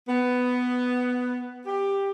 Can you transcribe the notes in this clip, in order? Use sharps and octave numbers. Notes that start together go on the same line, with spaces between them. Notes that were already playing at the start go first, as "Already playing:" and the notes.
B3
G4